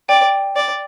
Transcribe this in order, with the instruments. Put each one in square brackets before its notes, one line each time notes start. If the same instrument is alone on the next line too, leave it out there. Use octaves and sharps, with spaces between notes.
[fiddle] D5 [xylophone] G5
[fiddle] D5